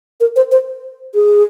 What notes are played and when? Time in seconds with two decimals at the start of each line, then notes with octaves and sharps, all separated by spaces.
0.20 A#4
0.36 C5
0.51 C5
1.14 G#4